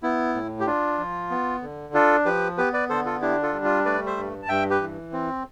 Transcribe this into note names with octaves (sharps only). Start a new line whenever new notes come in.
B3 E4
A2
G4
D4 F4
F3
B3
D3
D4 F4 A4
F3 G4 B4
B3 G4 B4
B4 D5
D3 A4 C5
F4 A4
D4 E4 G4
F4 A4
G3
F4
A3 B4 D5
C5 E5
G2
A5
G2 E5 G5
G4 B4
E3
C4